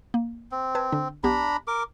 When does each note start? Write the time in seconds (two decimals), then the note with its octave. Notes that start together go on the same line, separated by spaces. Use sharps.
0.14 A#3
0.52 C4
0.75 B4 A5 G#6
0.92 D3 D4
1.24 B1 B3 D4 G4 A#5 B5
1.67 A#4 D6